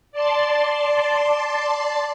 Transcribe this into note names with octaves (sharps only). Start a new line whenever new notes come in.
D5 A5 C6